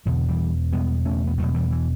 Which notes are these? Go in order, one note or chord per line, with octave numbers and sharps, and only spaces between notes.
E2 B2 D3 F#3
E3 G3
E2 B2 G3 B3
A3 C#4
B3
E2 B2 F#3 A3
E3 G3
E3